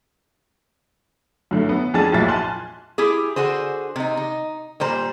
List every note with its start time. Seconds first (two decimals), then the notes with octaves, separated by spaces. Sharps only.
1.51 F#2 D3 A3
1.69 B3
1.94 F2 D4 G#4 G#5 A5 A6
2.12 B1 F2 A#2 E5 A6
2.28 G#5 A5 C6 F6 F#6
2.98 E4 G4 G#4
3.36 D3 F#4 G#4 C5
3.96 C3 D#4
4.17 D#4
4.80 A#2 G3 C5 A#5